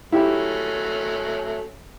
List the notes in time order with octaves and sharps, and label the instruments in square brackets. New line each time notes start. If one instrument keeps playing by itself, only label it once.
[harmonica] F#3 A3 C#4 [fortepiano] E4 G4